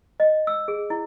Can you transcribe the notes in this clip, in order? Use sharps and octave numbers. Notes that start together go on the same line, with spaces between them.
D#5
E6
G#4
E4